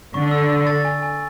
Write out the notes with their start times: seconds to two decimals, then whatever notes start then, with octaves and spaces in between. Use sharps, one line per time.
0.14 D3 C#6
0.31 E6
0.49 E6
0.67 A6
0.85 G#5
1.02 G#5